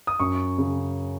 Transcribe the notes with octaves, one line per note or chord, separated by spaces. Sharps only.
D#6
F#2 C#6
C#3